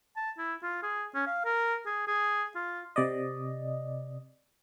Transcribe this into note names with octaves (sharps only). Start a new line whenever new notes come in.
A5
E4
F4
G#4
C#4
F5
A#4
G#4
G#4
F4
C3 D5 D#5